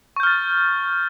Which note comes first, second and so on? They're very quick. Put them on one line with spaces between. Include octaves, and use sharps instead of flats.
C#6 G6 F6 A6